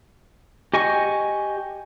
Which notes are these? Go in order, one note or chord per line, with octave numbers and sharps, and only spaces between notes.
G4 D#5 G#5 C#6